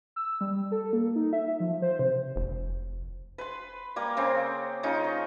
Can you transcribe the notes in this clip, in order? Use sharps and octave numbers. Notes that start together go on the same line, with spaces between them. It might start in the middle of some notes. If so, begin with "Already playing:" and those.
E6
G3
A4
A#3
D#4
E5
F3
C5
C3
F1
B4 C6
G3 A#3
C#3 C4
C#3 D#4 F4
C#6